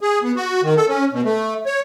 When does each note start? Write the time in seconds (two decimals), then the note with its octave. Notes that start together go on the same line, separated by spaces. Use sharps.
0.01 G#4
0.23 B3
0.36 F#4
0.63 D#3
0.77 A4
0.88 C#4
1.13 B2
1.25 A3
1.66 C#5